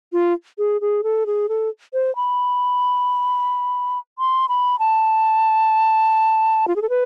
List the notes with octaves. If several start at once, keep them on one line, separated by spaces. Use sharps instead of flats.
F4
G#4
G#4
A4
G#4
A4
C5
B5
C6
B5
A5
F4
G#4
A4
B4